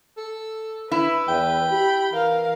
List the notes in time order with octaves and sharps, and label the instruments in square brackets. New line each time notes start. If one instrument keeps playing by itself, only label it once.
[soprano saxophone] A4
[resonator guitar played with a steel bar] E4 [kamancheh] B4
[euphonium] E2 [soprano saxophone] G5
[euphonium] G4 [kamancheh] B5
[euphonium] E3 [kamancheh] A#4 F5